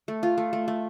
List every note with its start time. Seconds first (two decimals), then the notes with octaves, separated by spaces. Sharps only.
0.08 A3
0.23 F4
0.38 A3
0.53 A3
0.68 A3